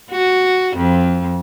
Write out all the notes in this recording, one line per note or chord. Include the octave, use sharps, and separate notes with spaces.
F#4
F2